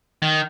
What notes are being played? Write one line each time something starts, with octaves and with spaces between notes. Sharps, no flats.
D#3